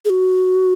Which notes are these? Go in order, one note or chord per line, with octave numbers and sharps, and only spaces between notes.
G#4
F#4